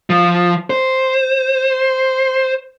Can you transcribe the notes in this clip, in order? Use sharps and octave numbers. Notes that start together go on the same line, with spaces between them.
F3
C5